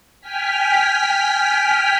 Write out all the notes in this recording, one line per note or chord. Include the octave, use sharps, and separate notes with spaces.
G5 G#5 F6 B6